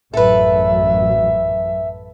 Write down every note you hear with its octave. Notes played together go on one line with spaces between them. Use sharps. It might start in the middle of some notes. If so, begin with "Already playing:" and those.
A1 F#2 F#3 A4 B4 E5